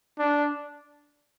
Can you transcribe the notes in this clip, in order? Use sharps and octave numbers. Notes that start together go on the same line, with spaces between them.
D4